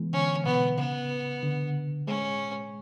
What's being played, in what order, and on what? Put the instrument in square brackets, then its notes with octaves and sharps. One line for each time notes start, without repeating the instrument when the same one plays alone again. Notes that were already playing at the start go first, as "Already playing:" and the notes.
Already playing: [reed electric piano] E3 G#3 B3
[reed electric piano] D3 [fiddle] C#4
[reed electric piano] B2 [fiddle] B3
[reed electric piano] C#3 [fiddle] B3
[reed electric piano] D3
[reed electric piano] G#3 [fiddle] C#4